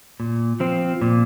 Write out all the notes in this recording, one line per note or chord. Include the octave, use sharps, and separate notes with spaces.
A#2
F3 C4
A#2